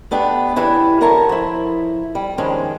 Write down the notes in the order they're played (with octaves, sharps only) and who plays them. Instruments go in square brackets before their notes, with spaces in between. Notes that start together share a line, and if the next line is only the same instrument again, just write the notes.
[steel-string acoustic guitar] A3 B3 D4 G4
C#3 E3 D4 E4 G4
F#2 D3 A#4 C#5 A5 A#5
F3 E4
G3
D#3 F3 G#3 C#4 D4